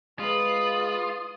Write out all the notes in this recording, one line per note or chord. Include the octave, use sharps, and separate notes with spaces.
G#3 F4 B4 B5 D#6